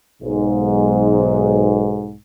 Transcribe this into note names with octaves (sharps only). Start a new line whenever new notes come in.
B1 G#2